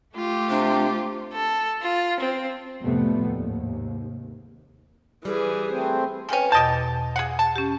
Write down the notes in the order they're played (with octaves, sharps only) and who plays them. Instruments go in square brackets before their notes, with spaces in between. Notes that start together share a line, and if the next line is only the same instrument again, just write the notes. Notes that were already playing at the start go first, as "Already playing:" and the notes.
[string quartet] A3 F4 G4
[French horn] C3 [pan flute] D4
[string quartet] A4
F4
C4
[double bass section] F2 A2 C3 G3 A3 B3
D#2 G#2 C3
[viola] E3 G#4 [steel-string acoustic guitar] G3
[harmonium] A3 C4 C5
[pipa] D#3 C#4 [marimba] B4 G5 G#5
[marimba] E2 B2 [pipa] G4 D#5 A5
[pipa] G#4 F5 F#5
A5
[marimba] C#4 G4